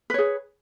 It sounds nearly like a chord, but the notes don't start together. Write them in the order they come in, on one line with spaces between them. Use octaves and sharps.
B4 C#5 G#4